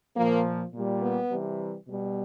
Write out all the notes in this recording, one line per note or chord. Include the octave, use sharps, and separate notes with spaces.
A#2 F3 A#3
A#2 G3
B3
C3 E3 G3
B2 G3